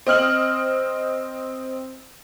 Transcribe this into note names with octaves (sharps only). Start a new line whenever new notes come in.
C4 D#5 F6 F#7